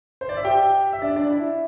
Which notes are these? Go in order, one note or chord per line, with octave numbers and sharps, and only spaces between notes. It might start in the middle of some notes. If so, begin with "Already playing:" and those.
C5
D5
E5
G4 G5
E5
D4 D5
D4 D5
E4 E5